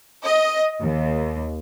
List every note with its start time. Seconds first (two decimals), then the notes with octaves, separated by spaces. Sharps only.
0.25 D#5
0.80 D#2